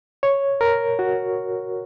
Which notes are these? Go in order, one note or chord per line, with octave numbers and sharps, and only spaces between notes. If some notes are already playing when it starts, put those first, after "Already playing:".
C#5
A#4
F#4